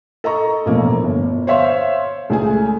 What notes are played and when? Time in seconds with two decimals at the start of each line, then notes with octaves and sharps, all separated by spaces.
0.24 A4 D#5 A#5 C#6
0.66 E1 A1 F3 A#3
1.04 G1
1.47 C5 C#5 E5 F5 C6
2.30 C#2 A3 G#4 G#5